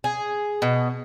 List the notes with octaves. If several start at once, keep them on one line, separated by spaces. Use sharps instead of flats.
G#4
B2